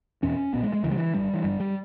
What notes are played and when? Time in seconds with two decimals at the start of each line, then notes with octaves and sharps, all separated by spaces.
0.22 E1 E2 B2 C#4
0.53 B1 A#2 B3
0.63 G#3
0.73 G#3
0.83 C#2 C#3 E3
0.91 G3
0.98 E3
1.14 G#1 G2 G3
1.34 E3
1.44 G1 G2 G3
1.60 G3